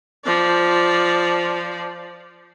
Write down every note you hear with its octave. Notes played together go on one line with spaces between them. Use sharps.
F3 D5